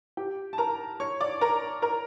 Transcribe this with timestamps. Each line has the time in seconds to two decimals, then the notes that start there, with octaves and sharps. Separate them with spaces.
0.17 G4 G5
0.53 A5
0.58 A#4 A#5
1.00 C#5 C#6
1.21 D5 D6
1.41 A#4 A#5
1.82 A#4 A#5